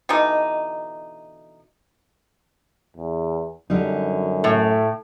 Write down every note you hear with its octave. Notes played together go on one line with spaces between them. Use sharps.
B2 D3 E3 D#4
E2
F#2 D3 G3 D#4
A2 A3